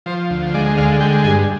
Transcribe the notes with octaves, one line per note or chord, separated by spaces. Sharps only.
F3 C5
D2
G#3 D5
D3 F5
G#3 G5
G2 G#5